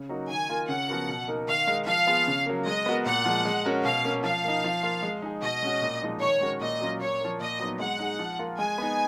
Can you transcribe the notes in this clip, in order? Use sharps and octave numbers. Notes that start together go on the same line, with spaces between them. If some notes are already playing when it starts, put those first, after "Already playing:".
Already playing: C#3
F#3 A#3 D#4 F#4
D#3 G#5
A#3 F4 A#4
C#3 F#5
F3 B3 F#4 A#4
B2
A#3 D#4 A#4
D#3 F5
G#3 D#4 A#4
F3 F5
B3 F4 G#4
C#3
F#3 A#3
G#3 D#5
B3 F#4 A#4
A#2 F#5
F3 G#3
G#3
C#4 F#4 A#4
B2 F5
A#3 C#4
F3 F5
A#3 D#4
F3
A#3 F4
G#3
D#4 G#4
B2 D#5
G#3 C#4 F#4
A#2
F3 G#3 D#4
D#3 C#5
G#3 C#4 F#4 A#4
A#2 D#5
F#3 C#4 F4
A#2 C#5
F3 A#3
A#2 D#5
F#3 B3 D#4
G#3 F#5
D#4 G#4
F3
A#3 F4 A#4
G#3 G#5
B3 D#4